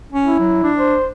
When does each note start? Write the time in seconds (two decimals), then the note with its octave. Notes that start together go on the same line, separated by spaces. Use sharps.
0.12 C#4
0.23 E4
0.39 F#3
0.63 D4
0.79 C5